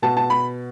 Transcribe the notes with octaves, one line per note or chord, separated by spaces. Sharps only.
B2 A5
A5
B5